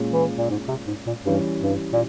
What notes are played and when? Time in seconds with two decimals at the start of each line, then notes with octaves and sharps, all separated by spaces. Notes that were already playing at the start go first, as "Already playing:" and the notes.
Already playing: A#2 G#3 C#4 F4
0.13 E3
0.37 A#2
0.50 G#2
0.68 C3
0.87 G#2
1.07 A#2
1.25 G2 E3 G3 C#4
1.62 G2
1.93 A#2